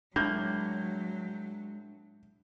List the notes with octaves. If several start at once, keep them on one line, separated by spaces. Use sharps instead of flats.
A2 F#3 G#3 A#3 D4 G6